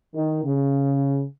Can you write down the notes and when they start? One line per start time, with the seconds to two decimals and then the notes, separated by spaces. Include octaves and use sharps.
0.15 D#3
0.45 C#3